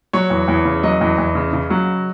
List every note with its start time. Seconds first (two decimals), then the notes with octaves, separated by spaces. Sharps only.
0.13 F#3 C#5
0.30 E2
0.48 E2
0.65 C#3
0.83 F#3 D#5
1.01 E2
1.18 E2
1.35 C#3
1.53 C#3
1.70 F#3